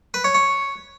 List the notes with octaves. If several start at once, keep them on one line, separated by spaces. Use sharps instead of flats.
B4
C#5
C#5